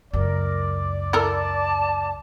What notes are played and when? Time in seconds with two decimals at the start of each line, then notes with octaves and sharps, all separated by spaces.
0.13 C#2 F#2 A#4 D5
1.13 E4 A4 A#4 A5